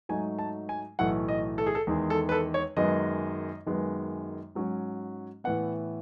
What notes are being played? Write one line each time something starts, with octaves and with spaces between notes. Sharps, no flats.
G#2 F#3 A3 D#4 G#5
A5
G#5
B1 A2 E3 A3 F#5
D#5
A4
G#4
A4
E2 D#3 G#3
A4
B4
A4
C#5
F#2 D#3 G#3 B3 D#5
F#2 D#3 G#3 B3
G#2 F#3 C#4
A2 E3 B3 F#5